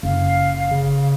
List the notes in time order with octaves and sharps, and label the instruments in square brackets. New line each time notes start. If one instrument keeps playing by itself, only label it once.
[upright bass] F#1 [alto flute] F5
[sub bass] C#3